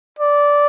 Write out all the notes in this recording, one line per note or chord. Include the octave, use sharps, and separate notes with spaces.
D5